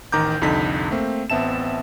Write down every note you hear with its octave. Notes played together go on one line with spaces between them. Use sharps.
A1 D#3 A#5 D6 G6
C2 F2 D3 D#4 B6
A3 A#3 C4
A1 B3 C4 E5 A5 E7